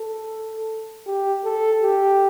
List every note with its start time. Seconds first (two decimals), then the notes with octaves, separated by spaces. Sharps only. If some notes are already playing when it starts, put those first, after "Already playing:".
Already playing: A4
1.07 G4
1.44 A4
1.83 G4